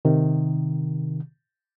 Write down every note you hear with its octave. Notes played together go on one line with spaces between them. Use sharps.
C3 D#3